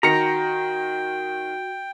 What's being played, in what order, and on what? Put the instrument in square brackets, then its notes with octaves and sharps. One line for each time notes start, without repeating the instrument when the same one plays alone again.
[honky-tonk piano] D#3 A#6 C#7 [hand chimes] F#4 [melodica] G5 [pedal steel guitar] A#5